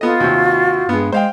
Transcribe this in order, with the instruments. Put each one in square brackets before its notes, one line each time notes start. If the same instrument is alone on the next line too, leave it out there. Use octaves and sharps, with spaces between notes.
[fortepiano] B3 D#5 [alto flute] F4 [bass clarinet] A4
[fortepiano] D#2 C3 [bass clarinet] F#4
[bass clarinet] G2 [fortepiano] G#3 B3
[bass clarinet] G#3 [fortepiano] C5 F5 G5